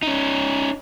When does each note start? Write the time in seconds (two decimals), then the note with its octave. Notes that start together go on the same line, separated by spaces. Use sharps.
0.03 C#4 D#4